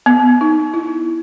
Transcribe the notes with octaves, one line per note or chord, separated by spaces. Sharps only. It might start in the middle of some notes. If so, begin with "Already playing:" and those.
B3
D#4
E4